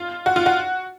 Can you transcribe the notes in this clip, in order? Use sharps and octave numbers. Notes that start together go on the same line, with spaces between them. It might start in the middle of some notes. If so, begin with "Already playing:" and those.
Already playing: F4
F#4
F4
F#4